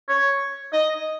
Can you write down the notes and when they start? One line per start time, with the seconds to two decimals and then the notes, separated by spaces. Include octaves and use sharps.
0.09 C#5
0.73 D#5